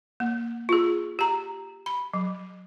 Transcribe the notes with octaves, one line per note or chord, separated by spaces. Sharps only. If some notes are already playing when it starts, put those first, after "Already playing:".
A#3
F4 G#4
G4 A#5
B5
F#3